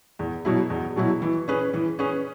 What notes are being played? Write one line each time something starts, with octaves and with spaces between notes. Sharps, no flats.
E2
B2 F#3 E4
E2
B2 F#3 E4
E3
C#4 G#4 B4
E3
C#4 G#4 B4